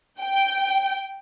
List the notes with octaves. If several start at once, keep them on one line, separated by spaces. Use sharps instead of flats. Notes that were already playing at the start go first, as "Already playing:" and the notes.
G5